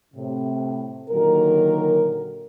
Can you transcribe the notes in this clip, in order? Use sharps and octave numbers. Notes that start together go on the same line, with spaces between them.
A2 C3
A#2 D3 D#3 F#3 A#4